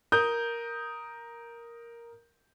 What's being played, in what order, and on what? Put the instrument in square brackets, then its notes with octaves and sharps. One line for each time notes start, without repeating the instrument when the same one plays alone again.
[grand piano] A#4 D#6 G6